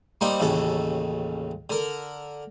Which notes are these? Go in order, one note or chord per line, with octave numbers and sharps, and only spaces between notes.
G3 A#3 C4 D#4
A1 D#2 C#3 A4
D3 A#4